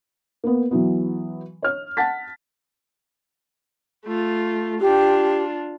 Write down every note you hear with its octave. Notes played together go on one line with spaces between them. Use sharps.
A#3 B3
E3 F#3 B3
C#5 F6
F#5 A5 A6 B6
A3 F4
D4 F4 G4